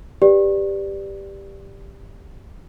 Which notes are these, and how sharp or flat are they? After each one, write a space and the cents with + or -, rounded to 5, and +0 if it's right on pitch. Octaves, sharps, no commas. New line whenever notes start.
G4 +10 B4 +0 D5 +0